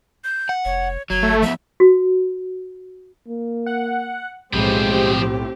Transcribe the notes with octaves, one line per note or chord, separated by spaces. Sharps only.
G6
F#5
F1 C#5
G1 F#3 G#6
A3
F3 B3 E5
F#4
A#3
F#5
B1 A2 F3 G#3 C4 G4 B4